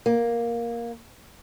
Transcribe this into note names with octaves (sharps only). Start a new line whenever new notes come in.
A#3